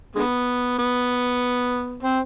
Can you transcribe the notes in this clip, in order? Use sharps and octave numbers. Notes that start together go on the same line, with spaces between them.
D3 G#3 B3
B3
C4